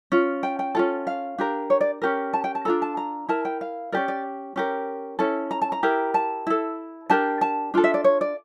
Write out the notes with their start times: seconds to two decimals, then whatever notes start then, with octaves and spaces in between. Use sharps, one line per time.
0.12 C#4 F4
0.43 G5
0.59 G5
0.75 C#4 F4 A4
1.07 F5
1.38 D4 G4 A#4
1.70 C#5
1.81 D5
2.02 C#4 G4 A#4
2.33 A5
2.44 G5
2.55 A5
2.65 D4 F4 A4 A#5
2.82 A5
2.97 A#5
3.29 E4 A#4 A5
3.45 G5
3.61 F5
3.92 C#4 G4 A#4 D5
4.08 D5
4.56 C#4 G4 A#4
5.19 C#4 E4 A4
5.51 A#5
5.62 A5
5.72 A#5
5.83 E4 G4 A#4
6.14 A5
6.47 E4 A4
7.10 D4 G4 A#4 A5
7.41 A5
7.74 D4 F4 A4
7.84 E5
7.94 D5
8.04 C#5
8.21 D5